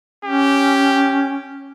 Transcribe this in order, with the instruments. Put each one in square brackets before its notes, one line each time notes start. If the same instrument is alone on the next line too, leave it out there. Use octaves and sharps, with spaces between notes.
[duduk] C#4 [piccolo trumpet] G4